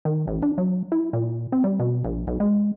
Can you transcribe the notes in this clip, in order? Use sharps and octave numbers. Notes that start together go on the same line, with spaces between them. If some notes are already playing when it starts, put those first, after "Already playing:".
D#3
A1
D4
F#3
E4
A#2
C4
G3
B2
A#1
B1
G#3